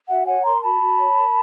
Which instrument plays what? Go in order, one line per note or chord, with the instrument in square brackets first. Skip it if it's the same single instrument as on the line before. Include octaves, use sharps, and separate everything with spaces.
[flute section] F#4 E5 F#5
C#5 F#5 G#5
A#4 A#5 C6
F#4 A5 B5
F#4
C#5
A#4